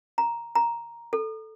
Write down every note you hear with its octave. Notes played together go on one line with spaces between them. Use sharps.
A#5
A#5
A4